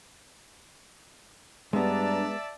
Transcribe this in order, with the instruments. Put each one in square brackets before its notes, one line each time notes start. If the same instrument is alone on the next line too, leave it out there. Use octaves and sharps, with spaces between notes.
[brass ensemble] G2 [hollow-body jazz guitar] G#3 B3 [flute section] D4 A#5 [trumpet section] D5 E5 A5